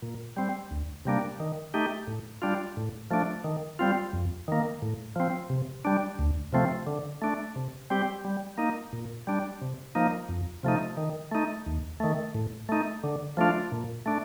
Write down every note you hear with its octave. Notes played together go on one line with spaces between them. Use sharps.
A#2
G3 C4
D2
C3 G3 A#3 D4
D#3
A3 D#4 G4
A2
G3 D4 F4
A2
F3 A3 D4
D#3
G3 C4 F4
F2
D#3 A#3
A2
F3 C4
C3
G3 D4
D2
C3 F3 A3 C4
D3
A3 D4
C3
G3 C4 G4
G3
A#3 D#4
A#2
G3 D4
C3
F3 A#3 D#4
F2
C3 F3 A3 D#4
D#3
A3 D#4
D#2
D#3 A3
A2
A3 D#4
D3
F3 A3 D4 F4
A#2
A3 D4